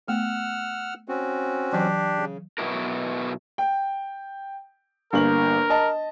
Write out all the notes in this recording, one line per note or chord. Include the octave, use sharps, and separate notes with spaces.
A3 B3 F#5 E6 F6
C4 C#4 F#4
E3 F#3 D4 G4 D6
C#3
B2 F#3 B3 E4 A#4
G5
G1 A#3 A#4 F#7
D#5 A5